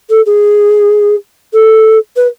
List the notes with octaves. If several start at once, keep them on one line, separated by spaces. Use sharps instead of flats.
A4
G#4
A4
B4